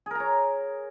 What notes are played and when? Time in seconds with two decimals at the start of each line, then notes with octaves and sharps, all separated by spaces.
0.06 G#4
0.11 A#4
0.15 A#5
0.20 C#5